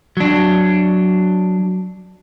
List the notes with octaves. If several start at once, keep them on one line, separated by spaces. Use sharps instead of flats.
F#3 D4